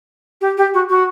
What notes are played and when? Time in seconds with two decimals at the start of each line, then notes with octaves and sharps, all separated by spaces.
0.41 G4
0.57 G4
0.73 F#4
0.89 F#4